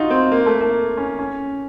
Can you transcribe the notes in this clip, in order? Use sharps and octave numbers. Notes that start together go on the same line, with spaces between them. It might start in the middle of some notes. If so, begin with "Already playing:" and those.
Already playing: D#4 F4 F#4
C4
A#3
A3
A#3
C#4
C#4